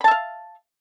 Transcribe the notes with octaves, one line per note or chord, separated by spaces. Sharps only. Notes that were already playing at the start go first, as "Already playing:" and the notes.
E5 F5 A5 B5